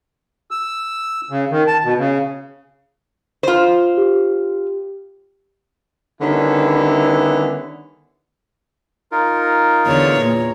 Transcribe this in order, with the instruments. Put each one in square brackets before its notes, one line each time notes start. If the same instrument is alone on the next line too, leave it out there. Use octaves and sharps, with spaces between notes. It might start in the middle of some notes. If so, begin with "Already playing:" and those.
[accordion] E6
C#3
D#3
A5
B2
C#3
[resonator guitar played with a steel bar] F4 C5
[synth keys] G4
[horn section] D3 D#3 G3 B3 C#4 E4
[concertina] D#4 F4 A#4
[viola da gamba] E2 D3 C#5
[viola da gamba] A#2 [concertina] C#5 A#5